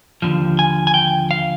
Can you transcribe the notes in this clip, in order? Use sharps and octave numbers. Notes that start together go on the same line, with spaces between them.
D#2 D3 F3
G#5
G#5
G5
F5